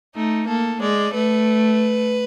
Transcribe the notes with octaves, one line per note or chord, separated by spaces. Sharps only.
A3 D#4
A#3 A4
G#3 D5
A3 B4